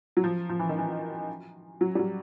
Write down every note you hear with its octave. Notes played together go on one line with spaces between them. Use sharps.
F#3
F3
F3
E3
D#3
E3
F#3
G3
F#3